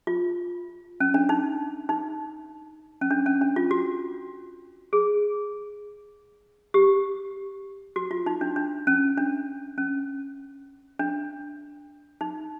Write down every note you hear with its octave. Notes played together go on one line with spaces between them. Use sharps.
F4
C#4
D4
D#4
D#4
C#4
D4
C#4
D4
F4
F#4
G#4
G4
F#4
F4
D#4
D4
D4
C#4
D4
C#4
D4
D#4